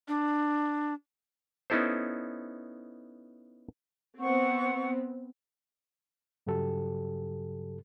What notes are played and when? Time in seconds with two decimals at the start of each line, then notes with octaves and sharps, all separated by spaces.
0.08 D4
1.70 B3 C#4 D#4 E4 A4 C5
4.20 B3 C4 F#5 C#6
6.47 G2 C#3 F#3 G4 A4